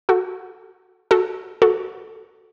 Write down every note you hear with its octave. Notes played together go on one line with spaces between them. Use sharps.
F#4 A4
F#4 A4
F#4 A4